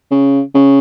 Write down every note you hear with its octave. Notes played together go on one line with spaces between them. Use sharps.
C#3
C#3